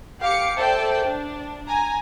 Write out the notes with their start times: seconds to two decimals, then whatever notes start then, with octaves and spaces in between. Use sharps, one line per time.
0.22 G4 F5 D6 C#7
0.58 A4 C5 D5 E5 G5 A5
1.08 D4
1.68 G#5 A#5